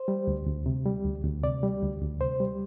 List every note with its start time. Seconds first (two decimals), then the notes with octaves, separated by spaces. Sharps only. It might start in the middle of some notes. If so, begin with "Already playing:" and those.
Already playing: C5
0.08 G3
0.27 D2
0.47 D2
0.66 C3
0.85 G3
1.05 D2
1.24 D2
1.44 C3 D5
1.63 G3
1.82 D2
2.02 D2
2.21 C3 C5
2.40 G3